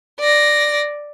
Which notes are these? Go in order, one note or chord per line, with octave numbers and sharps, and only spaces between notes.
D5 A#6